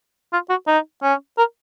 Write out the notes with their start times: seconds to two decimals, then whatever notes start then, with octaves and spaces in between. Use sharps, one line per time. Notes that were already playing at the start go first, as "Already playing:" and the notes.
0.33 F4
0.49 F#4
0.67 D#4
1.03 C#4
1.38 A#4